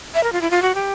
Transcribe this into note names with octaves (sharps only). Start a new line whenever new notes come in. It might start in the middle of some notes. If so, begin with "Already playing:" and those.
E5
A#4
F4
E4
F4
F#4
G4